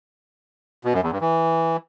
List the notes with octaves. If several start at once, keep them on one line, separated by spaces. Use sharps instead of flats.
B2
F#2
E2
G2
E3